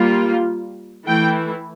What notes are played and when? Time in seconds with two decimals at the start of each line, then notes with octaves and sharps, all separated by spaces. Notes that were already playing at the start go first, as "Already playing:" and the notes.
Already playing: G3 A#3 F4
1.07 E3 A3 E4 G5